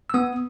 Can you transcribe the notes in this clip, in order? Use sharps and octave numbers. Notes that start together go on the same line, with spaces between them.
E6
B3 D#6